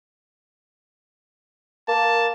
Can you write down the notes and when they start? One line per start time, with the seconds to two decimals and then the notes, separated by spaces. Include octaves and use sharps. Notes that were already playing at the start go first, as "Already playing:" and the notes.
1.88 A#3 A5